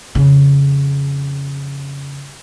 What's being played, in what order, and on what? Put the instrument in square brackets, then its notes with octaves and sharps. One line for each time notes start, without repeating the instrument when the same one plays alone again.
[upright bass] F2 C#3